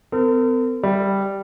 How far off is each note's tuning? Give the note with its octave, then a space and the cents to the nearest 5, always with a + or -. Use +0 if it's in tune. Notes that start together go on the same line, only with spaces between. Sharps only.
C4 -45 A#4 -45
G3 +0 E5 +0